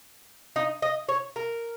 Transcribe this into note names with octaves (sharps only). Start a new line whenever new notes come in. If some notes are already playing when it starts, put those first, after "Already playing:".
D#4
D#5
C#5
A#4